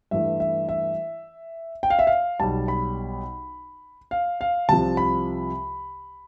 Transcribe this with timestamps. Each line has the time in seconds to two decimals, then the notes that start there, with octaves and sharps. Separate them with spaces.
0.11 G2 E3 A3 E5
0.40 E5
0.69 E5
1.83 G5
1.90 F5
1.99 E5
2.07 F5
2.40 B1 B2 G3 A5
2.68 B5
4.11 F5
4.41 F5
4.69 C2 C3 F3 A5
4.97 B5